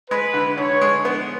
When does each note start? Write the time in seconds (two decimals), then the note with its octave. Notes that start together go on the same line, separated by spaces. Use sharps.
0.11 G#3 B4
0.34 D3
0.57 D3 C#5
0.81 G#3
1.05 B3